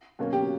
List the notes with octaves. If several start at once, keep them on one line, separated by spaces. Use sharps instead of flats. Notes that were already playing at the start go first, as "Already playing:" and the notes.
B2 F#3 A#3 C#4
G4